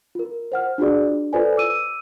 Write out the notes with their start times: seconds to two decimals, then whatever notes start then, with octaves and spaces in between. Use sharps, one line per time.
0.15 F4 A#4
0.52 C5 F#5 F6
0.78 D4 F4 F#4 G#4 D5
1.05 D4
1.33 F4 A4 B4 C5 D5 G#5
1.57 D6 E6 D#7